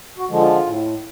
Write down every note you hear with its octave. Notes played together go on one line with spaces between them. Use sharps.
F#4
D3 F3 G#3
F4
A2